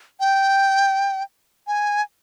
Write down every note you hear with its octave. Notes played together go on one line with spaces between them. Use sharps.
G5
G#5